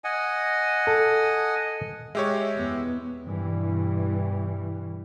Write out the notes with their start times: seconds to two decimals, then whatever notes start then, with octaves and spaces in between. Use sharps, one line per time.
0.04 D#5 F#5 G#5
0.87 A4 A5
2.15 G#3 G4 C#5 E5
2.55 E2 B3
3.24 G2 B2 E3 G3